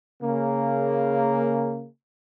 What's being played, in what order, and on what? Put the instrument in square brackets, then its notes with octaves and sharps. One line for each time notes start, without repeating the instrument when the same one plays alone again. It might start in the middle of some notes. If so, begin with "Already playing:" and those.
[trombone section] C#3 A#3